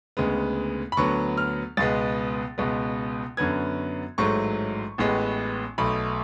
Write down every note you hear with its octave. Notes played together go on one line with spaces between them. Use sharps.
D2 C#3 G#3 B3
B5
D2 D3 F#3 B3 C#6
F6
C#2 B2 G#3 B3 A6
C#2 B2 G#3 B3
F#2 D3 F#3 B3 G#6
A1 G#2 F#3 A3 C#6
A1 A2 G#3 B3
B1 B2 A3 B5